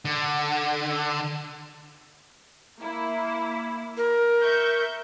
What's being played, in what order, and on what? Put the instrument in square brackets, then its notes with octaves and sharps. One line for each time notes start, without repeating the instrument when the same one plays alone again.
[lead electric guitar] D3
[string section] A#3 E4
[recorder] A#4
[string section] E5 C#6 G6